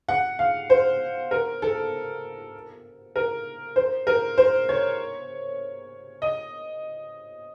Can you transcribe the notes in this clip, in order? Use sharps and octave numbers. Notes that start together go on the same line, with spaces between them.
F#5
F5
C5
A#4
A4
A#4
C5
A#4
C5
C#5
D#5